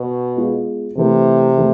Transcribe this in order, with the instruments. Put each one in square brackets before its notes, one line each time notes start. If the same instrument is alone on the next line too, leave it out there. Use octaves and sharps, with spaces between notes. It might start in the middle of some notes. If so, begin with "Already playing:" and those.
Already playing: [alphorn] B2
[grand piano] G#3 B3 F4
[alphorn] C3 [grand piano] E3 A3 E4 B4
[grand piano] E3 A3 E4 B4